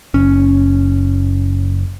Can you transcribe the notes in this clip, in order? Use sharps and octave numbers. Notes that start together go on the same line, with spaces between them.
F#1 C#4